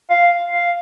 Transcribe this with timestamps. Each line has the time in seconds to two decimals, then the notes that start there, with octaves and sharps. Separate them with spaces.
0.10 F5
0.50 F5